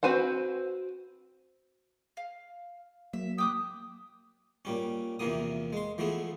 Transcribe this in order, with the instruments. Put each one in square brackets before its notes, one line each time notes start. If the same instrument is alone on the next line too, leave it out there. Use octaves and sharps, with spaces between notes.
[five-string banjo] C4 F#4 B4 C5 F#5
[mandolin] F5
[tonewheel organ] F#3 A#3 [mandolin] E5
[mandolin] G5 D6 F#6 [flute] D#6
[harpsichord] A#2 G3 C#4
E2 C3 E3 F3 A#3 D#6
G#3 C6
E3 F3 A3 B3 G#4